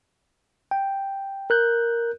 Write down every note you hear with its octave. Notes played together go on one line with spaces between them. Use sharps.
G5
A#4 F#6 G6